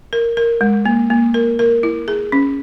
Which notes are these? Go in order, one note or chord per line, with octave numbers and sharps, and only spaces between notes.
A#4
A#4
G#3
A#3
A#3
A#4
A#4
E4
G#4
C#4